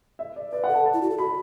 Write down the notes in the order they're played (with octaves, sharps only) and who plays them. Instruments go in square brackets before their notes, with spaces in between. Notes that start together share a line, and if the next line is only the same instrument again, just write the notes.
[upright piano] E5
D5
[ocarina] B4 [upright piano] D5
[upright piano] F#5
[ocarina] A4
[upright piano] A5
A5
[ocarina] E4
F#4
A4
[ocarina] F#4 [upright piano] B5